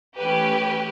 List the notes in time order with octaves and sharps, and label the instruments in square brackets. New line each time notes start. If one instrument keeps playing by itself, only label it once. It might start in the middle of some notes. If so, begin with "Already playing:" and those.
[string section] E3 A3 C#4 G4 B4